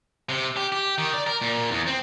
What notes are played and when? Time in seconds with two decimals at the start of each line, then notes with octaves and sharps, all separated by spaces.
0.29 C3
0.57 G4
0.72 G4
0.98 D#3
1.14 D5
1.27 A#4
1.42 A#2
1.71 E2
1.87 C4